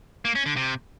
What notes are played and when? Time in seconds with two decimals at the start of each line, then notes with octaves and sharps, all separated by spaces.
0.25 A#3
0.35 C#4
0.46 D3
0.56 C3